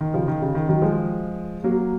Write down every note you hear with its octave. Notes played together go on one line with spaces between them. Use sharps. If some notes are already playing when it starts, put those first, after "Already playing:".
D#3
C#3 F3
D#3
C#3
D#3
D#3 F#3
F3 G#3
F#3 A#3